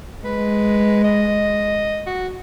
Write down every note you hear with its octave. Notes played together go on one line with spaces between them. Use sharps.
G#3 B4
D#5
F#4